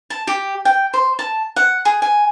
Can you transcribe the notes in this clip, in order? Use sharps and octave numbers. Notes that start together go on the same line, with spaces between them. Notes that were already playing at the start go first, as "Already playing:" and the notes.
A5
G4
G5
C5
A5
F#5
G#4
G#5